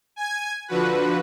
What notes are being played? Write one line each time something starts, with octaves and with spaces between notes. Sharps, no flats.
G#5 G#6
D3 F3 F#4 B4